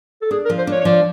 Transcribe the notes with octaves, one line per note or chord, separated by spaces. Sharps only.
A4
D4 G#4
A#4
F3
C5
D4 C#5
C#5
F3 D5